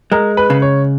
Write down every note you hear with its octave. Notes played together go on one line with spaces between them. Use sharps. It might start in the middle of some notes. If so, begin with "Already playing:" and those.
G#3 A#4
B4
C#3
C#5